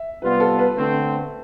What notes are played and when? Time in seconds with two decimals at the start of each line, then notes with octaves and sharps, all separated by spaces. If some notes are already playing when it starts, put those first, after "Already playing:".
Already playing: E5
0.22 C3 G3 B3 F4 B4
0.40 A4
0.59 B4
0.77 D3 A3 C4